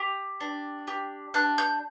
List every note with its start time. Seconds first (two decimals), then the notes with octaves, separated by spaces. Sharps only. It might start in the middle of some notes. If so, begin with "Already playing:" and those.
Already playing: G4
0.41 D4
0.88 G4
1.34 D4 F#6
1.58 G6